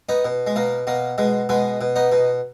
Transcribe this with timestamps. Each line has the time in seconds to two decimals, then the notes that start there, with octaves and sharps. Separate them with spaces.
0.09 B3 D#4
0.25 B2
0.47 G#3
0.56 B2 A#3
0.87 B2 A#3
1.18 B2 G#3
1.49 B2 G#3 B3
1.81 B2
1.96 B3 D#4
2.12 B2